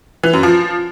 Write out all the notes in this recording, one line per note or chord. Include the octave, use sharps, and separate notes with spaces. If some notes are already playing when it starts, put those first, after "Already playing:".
E3
F#2
F3